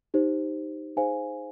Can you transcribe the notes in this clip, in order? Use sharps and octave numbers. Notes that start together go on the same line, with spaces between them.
D#4 G4 C5
D#4 G#4 C5 F5 G#5